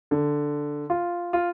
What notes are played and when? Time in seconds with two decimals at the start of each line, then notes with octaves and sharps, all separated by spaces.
0.11 D3
0.90 F4
1.33 F4